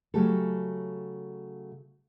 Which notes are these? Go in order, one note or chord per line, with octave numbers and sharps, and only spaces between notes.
C#3 F#3 A3 G4 A4